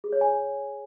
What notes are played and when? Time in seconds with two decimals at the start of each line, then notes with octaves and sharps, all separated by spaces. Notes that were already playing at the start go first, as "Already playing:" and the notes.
0.04 G#4
0.13 C#5
0.21 G#5